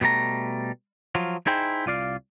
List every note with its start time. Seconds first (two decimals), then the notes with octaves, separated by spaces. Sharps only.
0.01 B2 G3 A3 A#5
1.15 F3 F#3 F4
1.47 D#4 E4 G#4 C5 G5
1.86 C2 F4 D5 F5